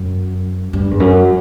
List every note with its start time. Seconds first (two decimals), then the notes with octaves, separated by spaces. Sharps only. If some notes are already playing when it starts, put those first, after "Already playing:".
Already playing: F#2
0.73 G2
0.91 E2
1.00 F#2